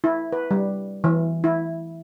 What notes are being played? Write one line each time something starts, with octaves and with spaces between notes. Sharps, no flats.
E4
B4
G3
E3
E4